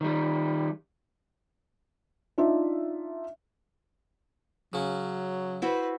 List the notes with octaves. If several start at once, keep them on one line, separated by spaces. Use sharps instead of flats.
D#3 G3
D4 D#4 F4 E5
C#3 F#3 C#4
E4 F#4 B4 C5